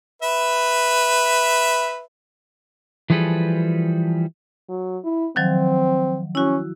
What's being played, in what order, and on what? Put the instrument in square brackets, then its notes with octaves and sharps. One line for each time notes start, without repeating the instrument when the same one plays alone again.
[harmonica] B4 E5
[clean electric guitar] E3 F3 G3 G#4 A4 B4
[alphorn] F#3
E4
[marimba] D#3 F3 F#3 [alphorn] C4
[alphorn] C#4 [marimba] E4 F#4